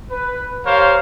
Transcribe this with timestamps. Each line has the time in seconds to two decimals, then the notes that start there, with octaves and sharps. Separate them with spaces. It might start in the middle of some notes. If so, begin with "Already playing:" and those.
0.11 B4
0.65 G4 A#4 C5 C#5 F5